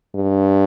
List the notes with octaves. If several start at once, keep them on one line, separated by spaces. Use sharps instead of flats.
G2